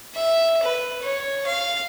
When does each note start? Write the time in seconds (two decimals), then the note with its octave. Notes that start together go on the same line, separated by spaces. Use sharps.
0.15 E5
0.62 B4
1.02 C#5
1.46 F5